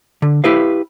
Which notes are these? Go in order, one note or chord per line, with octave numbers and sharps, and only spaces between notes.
D3
E4 G4 B4 F5